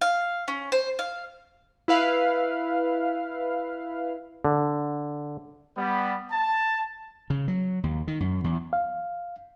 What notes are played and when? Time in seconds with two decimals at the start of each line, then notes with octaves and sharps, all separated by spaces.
0.01 F5
0.48 C#4
0.72 C5
0.99 F5
1.88 E4 B4 F5
4.45 D3
5.77 G3 B3
6.31 A5
7.30 C#3
7.48 F#3
7.83 D#2
8.07 D#3
8.20 F#2
8.44 E2
8.73 F5